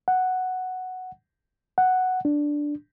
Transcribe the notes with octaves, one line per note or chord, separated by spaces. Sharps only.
F#5
F#5
D4